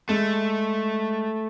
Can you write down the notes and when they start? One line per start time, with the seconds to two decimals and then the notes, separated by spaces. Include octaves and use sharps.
0.09 G#3 A3